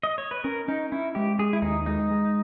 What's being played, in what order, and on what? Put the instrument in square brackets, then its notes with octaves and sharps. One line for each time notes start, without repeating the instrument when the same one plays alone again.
[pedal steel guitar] D#5
C#5
B4
[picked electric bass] C#4 [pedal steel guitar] A#4
[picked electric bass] C#4 [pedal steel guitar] D#4
[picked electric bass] C#4 [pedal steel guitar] E4
[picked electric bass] G#3 [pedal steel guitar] G4
[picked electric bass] G#3 [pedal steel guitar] G#4
[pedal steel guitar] E4
[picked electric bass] D#2 [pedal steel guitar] D#4
[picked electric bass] G#3 [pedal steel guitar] D#4
[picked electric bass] G#3